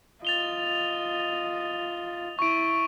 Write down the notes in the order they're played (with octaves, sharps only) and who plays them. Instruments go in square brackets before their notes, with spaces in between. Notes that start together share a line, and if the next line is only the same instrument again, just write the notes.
[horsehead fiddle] F4 D#5 [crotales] A6 F7 G7
[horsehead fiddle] E4 [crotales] C#6 D7